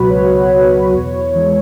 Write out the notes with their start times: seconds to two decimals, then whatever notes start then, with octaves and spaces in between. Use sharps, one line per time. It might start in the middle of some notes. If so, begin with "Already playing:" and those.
Already playing: C#2 B2 F#3 F#4 B4
0.10 C#2 C#5
0.51 B2 F#3
0.93 E2
1.35 E3 G#3